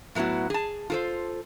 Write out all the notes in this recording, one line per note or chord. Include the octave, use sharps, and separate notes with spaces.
A2 F#3 B3 E4 F#4
G#4 A5
F4 A4 C5